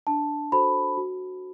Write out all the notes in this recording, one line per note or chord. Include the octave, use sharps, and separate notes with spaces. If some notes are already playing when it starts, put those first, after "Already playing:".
D4 A5
F#4 A4 C5 B5
F#4